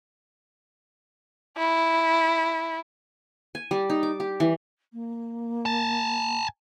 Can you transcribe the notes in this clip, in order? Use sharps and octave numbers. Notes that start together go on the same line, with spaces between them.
E4
G#5
G3
D#4
D6
G4
E3
A#3
G#5 A5